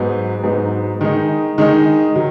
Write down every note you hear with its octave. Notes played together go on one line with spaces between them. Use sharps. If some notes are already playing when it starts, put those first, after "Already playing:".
Already playing: G#2 F#3 B3 D#4
G#2 F#3 B3 D#4
D#3 G#3 D#4
D#3 G#3 D#4
D#3 F#3